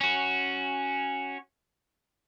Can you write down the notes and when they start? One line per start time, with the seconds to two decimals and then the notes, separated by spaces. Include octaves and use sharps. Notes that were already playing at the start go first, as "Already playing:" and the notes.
0.01 C#4 F#4